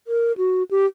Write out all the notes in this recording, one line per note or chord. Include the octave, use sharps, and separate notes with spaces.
A#4
F#4
G4